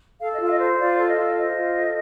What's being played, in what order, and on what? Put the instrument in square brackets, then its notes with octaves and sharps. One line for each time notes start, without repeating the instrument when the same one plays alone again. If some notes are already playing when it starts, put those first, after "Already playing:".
[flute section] A4 F5
D#5
F4
F5
D#5
C5
F4 D5
A4
D#5
F4
C5 D#5
F4
A4